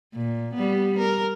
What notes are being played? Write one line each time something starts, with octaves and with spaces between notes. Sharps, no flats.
A#2
G3 B3
A#4